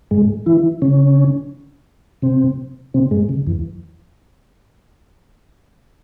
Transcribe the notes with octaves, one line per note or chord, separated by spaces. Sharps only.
G#2 G#3
E3 E4
C#3 C#4
C3 C4
C3 C4
G#2 G#3
C#3
E2 E3